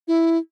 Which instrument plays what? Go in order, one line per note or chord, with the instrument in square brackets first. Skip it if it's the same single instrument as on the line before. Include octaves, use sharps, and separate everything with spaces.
[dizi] E4